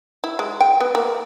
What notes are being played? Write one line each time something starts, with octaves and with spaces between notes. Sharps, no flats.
E4
G#3
G5
B3
A#3